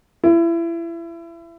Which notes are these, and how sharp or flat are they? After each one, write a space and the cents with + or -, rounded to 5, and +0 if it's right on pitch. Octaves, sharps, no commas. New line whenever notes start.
E4 +30